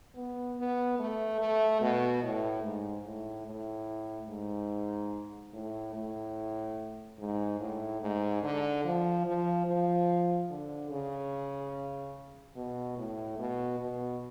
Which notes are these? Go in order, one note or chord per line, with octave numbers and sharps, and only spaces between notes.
B3
B3
A3
A3
B2
A2
G#2
A2
A2
G#2
A2
A2
G#2
A2
G#2
D3
F3
F3
F3
D3
C#3
B2
A2
B2
B2